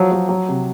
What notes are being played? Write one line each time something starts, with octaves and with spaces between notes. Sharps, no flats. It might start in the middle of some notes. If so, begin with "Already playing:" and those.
Already playing: F3 F#3
F#3
F#3
C3